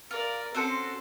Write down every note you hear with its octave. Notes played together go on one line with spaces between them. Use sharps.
F4 A#4 D5
C4 C#4 F#4 A4 C6